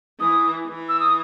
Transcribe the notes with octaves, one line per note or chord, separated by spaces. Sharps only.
E3 D#6
E3
E6
D#6